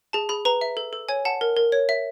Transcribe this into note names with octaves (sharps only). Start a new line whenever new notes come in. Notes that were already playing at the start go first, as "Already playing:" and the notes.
G#4 A5
G#4 B5
B4 A#5
E5
A4
A4
C#5 G#5
F#5 A5
A#4
A#4
C#5
E5